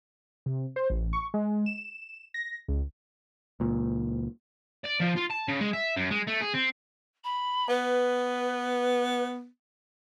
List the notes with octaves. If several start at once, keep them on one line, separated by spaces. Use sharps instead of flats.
C3
C5
A1
C#6
G#3
E7
A#6
C#2
C#2 A#2
D5
F3
F4
A5
C#3
G#3
E5
F#2
G#3
A3
G#4
C4
B5
B3 B4